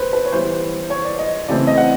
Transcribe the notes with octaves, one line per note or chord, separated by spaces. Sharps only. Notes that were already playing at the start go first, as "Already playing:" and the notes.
Already playing: B4 C5
B4
C#5
E3 G3 B3 C5
C#5
D5
D#5
C#3 E3 A3 C4 D5
D#5
F#5